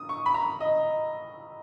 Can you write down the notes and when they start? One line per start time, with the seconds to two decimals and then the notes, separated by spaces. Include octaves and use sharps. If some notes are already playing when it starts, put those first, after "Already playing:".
Already playing: D#6
0.09 C#6
0.26 B5
0.34 A#5
0.60 D#5